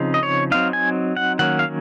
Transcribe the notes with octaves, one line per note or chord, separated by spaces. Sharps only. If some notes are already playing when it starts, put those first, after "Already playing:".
Already playing: C#3 F3 C4 D#4
D#5
C#5
F#3 C4 D#4 F5
G#5
F#5
D#3 F#3 A#3 C#4 F#5
F5